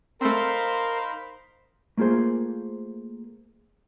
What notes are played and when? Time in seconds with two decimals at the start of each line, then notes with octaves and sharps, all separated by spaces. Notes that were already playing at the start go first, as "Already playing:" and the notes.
0.21 A3 C4 D#4 A#4 C5 F5 B5 C6
1.97 A3 A#3 F4 G#4 C5